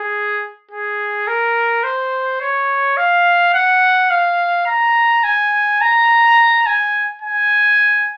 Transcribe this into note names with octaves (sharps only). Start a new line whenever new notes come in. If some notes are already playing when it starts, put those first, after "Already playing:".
Already playing: G#4
G#4
A#4
C5
C#5
F5
F#5
F5
A#5
G#5
A#5
G#5
G#5